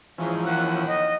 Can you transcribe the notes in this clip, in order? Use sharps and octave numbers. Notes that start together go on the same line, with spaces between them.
G#2 E3 F3 C#4
D#2 F#5
D#5